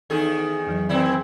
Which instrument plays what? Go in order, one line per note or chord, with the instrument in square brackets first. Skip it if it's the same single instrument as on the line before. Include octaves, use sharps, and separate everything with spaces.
[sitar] E2 D#3 G#4 [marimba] D#4 A4
[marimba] F2 E3 F#3
[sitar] D#3 E3 E4 [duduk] C4 [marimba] D5